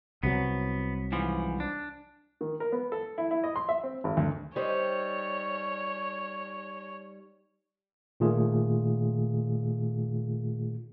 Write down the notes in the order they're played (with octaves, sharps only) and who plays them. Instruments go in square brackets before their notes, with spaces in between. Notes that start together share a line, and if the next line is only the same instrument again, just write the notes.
[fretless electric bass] C2 C3 F#3 [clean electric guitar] B3
[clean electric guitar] G#2 E3 F3
D4
[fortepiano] D#3
A#4
B3
A4
E4
E4
D#5
C6
E5
C4
G#1
D2
[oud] G3 D#4 C5 [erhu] C#5
[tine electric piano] A#2 D#3 A3 F4 G#4